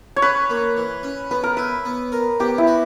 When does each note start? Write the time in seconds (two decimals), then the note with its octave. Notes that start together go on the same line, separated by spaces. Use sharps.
0.16 C#5
0.22 C#4 B4
0.50 A#3
0.77 E3
1.03 C#4
1.31 B3 B4
1.43 A#4
1.57 E4 B4
1.85 B3
2.12 A#4
2.40 B3 G4
2.58 E4
2.67 F#4